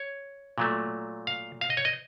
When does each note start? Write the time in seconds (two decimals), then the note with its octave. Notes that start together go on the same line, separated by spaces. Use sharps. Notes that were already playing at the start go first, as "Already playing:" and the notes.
Already playing: C#5
0.58 A#2 F#3 A3
1.27 F5
1.61 F5
1.70 D#5
1.77 C#5
1.85 D#5